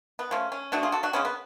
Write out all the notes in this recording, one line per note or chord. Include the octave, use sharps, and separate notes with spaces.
B3
F3 A3 C#4
C#4
B2 A3 D4 F#4
F4 G#4
F#4 A4
D4 F#4
C#3 G#3 B3 C#4
B3